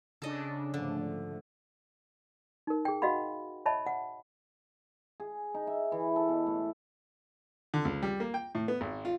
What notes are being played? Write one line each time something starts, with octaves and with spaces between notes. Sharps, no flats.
C#3 D4 A4 D#5
G#2 D3 F3 A3
D#4 A#4
G#4 G5
F#4 D#5 F5 F#5 B5
C#5 D#5 E5 A5 B5
F#5
G#4
D#4
E5
E3
A4
B2
A2
D3
C#2
G3
A#3
G5
A2
B3
G#1
F4